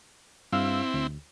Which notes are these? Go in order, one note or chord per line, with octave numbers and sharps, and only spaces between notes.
G2 C4 E4 F5 E6
D2